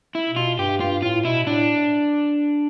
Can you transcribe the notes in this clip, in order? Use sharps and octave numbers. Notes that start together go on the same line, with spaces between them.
E4
B2
F4
G2 G4
G2 F4
A2 F4
B2 E4
A2 D4